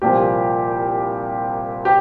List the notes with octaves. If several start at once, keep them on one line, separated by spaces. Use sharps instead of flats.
C2 A#2 F3 G4
G4